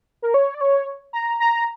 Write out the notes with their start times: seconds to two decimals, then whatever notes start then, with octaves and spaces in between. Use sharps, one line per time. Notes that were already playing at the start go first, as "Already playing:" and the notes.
0.22 A#4
0.34 C#5
0.54 D5
0.61 C#5
1.13 A#5
1.40 A#5